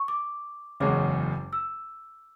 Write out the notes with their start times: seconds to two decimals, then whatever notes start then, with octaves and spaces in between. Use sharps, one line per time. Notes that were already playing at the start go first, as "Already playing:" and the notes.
Already playing: C#6
0.08 D6
0.80 F#1 E2 C#3 G#3 C#4 D6
1.53 E6